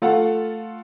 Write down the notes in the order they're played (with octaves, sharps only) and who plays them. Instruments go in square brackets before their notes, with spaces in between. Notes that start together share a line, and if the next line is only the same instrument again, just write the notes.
[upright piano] A3 F4 A4 F5 F#5